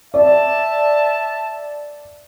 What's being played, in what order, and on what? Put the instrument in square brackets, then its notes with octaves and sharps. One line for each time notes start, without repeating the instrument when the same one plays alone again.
[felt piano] D5 [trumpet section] E5 A5